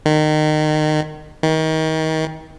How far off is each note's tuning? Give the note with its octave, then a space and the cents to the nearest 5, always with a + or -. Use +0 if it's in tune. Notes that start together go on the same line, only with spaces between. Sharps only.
D#3 -25
D#3 +30